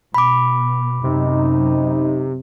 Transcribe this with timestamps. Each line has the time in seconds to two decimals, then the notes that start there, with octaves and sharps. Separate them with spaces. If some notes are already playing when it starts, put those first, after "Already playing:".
0.14 B2 B5 D6
1.04 F#2 C3 D#4